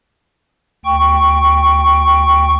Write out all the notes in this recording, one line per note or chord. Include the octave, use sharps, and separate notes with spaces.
D2 G5 C#6